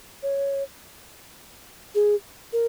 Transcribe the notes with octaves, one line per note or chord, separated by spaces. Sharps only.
C#5
G#4
A#4